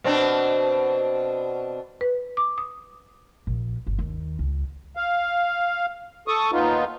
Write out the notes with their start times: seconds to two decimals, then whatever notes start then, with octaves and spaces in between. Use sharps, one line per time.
0.04 B2 C4 D4
2.01 B4
2.37 D6
2.58 D#6
3.47 A#1
3.87 G1
3.99 D#2
4.39 C#2
4.97 F5
6.28 A4 C#6 D#6
6.53 D#2 B3 D#4 F4